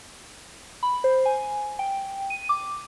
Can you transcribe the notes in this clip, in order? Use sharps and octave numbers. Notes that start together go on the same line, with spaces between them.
B5
C5
G#5
G5
D#7
D6